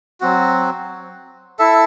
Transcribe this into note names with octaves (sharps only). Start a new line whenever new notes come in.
F#3 C4 F#4
E4 A4 E5